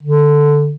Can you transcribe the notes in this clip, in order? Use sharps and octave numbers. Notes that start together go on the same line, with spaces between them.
D3